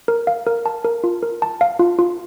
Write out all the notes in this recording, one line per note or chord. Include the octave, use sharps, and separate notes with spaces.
A#4
F5
A#4
A5
A#4
F4
A#4
A5
F5
F4
F4